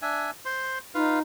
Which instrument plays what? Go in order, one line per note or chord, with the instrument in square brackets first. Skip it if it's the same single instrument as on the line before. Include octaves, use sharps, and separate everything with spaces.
[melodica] D4 E5 G#5
C5 C6
[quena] D#4 [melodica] F4 B4 F5